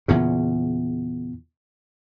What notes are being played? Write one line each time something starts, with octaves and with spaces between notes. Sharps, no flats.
E2 A#2 C#3